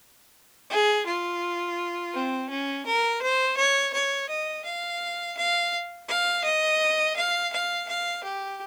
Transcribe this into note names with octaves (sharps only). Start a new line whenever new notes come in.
G#4
F4
C4
C#4
A#4
C5
C#5
C#5
D#5
F5
F5
F5
D#5
F5
F5
F5
G4